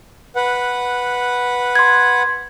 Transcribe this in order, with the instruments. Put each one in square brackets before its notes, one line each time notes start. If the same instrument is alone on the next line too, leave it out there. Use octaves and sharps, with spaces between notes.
[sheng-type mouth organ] B4 F#5
[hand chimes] C6 G#6